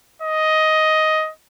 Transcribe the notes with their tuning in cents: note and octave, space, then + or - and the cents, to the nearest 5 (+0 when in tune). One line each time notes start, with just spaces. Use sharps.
D#5 +10